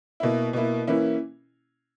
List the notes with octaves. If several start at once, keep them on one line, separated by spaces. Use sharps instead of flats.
B2 A#3 E4
B2 A#3 E4
E3 A#3 C#4 E4